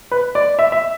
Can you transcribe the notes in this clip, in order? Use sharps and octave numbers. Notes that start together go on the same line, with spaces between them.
B4
D5
E5
E5